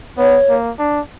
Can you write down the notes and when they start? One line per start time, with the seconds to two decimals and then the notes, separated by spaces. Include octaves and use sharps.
0.18 B3 C#5
0.50 A#3
0.79 D4